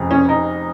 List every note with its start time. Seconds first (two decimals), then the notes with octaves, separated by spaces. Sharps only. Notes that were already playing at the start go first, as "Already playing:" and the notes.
Already playing: F1 F2 C#3
0.11 C#4
0.29 D#4